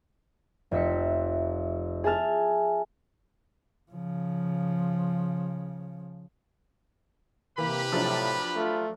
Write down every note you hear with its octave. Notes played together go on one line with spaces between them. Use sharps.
F1 F2 E5 B6 C#7
G#4 E5 G#5 A5 F6
C#3 F3
C3 E3 A#3 G4 B4 B5
A2 F3 F#3 D4
A3 F4